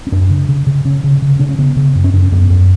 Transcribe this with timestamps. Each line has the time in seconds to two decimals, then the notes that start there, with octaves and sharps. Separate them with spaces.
0.07 C#4
0.12 F#2 D4
0.30 C#3
0.49 C#3
0.67 C#3
0.85 C#3 C#4
1.04 C#3
1.22 C#3
1.39 C#3 D4
1.49 C#4
1.58 C#3 B3
1.76 C#3
1.95 F#2
2.04 C#4
2.13 F#2 D4
2.22 C#4
2.32 F#2 B3
2.50 F#2